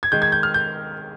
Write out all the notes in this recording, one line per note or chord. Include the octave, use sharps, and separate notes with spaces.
G#6
D#3 G#3 G6
G#6
G6
F6
G6